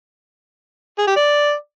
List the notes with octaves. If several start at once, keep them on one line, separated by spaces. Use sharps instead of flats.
G#4
G4
D5